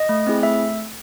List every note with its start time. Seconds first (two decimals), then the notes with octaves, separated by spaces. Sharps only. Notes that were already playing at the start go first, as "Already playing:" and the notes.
Already playing: D#5
0.09 A3
0.27 C4 E4 G#4
0.43 A3 E5